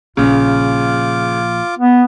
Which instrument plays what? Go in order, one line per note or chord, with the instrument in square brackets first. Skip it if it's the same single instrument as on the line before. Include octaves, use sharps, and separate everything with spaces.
[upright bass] A#1 [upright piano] C#3 [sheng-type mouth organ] F4 D6
[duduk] B3